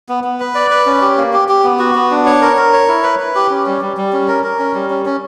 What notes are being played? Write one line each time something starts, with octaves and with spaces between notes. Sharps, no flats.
B3
B3
B4
D5
B4
C#4
G4
A#3
G4
G4
B3
F#4
B3
D4
C#5
A#4
A#4
C#5
E4
B4
B4
G4
C#4
G3
G3
G3
C#4
A#4
A#4
C#4
G3
C#4
C#4